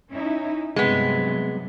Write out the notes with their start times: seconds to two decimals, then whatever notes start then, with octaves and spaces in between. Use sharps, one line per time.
0.12 C#4 D#4 E4
0.76 G2 C3 F#3 G#3 B3